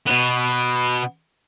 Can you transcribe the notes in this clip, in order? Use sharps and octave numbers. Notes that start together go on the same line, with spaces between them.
B2 B3